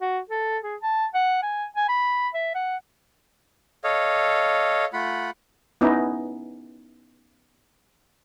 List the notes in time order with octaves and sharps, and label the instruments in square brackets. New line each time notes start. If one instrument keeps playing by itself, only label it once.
[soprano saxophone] F#4
A4
G#4
A5
F#5
G#5
G#5
B5
E5
F#5
[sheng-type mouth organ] A4 C#5 D#5 F5
A3 F4 F#5 B5
[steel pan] B3 C#4 D#4 E4